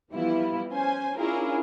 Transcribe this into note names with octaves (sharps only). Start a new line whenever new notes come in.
E3 F3 G3 B3 E4 F4
C#4 C5 G#5
C#4 D4 E4 F4 G#4 A#4